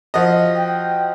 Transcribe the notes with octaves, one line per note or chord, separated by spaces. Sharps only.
F3 F#4 D#5
G5